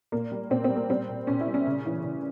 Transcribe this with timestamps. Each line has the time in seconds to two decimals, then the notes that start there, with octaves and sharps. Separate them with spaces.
0.12 A#2 A#3
0.32 G3
0.50 A#2 C4
0.64 C4
0.70 G3
0.76 A#3
0.90 G3 C4
1.09 A#2
1.27 A#2 C#4
1.41 E4
1.47 G3
1.54 C#4
1.67 C#3
1.86 E3
2.04 C#3